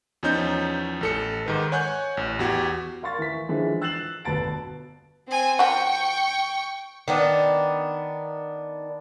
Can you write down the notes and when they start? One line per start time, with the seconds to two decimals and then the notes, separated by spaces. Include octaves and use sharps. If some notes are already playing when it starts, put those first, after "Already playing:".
0.23 E2 F3 C#4 D#4 G6
1.01 A1 A4 C#7
1.46 G#2 D#3 B4
1.72 C#5 F#5 G#5 C#6 F#6 G6
2.17 A1
2.39 E2 F#4 G4 G#6
3.02 A#4 F5 C6 C#6 A6
3.19 E3 B6
3.49 D3 E3 F3 G#3
3.81 E6 F#6 A6 C7 E7 F#7
4.25 G1 B2 B3 A5 A6 D7
5.28 C4 G#5
5.59 F3 F#4 G5 C#6
7.08 D#3 B3 D4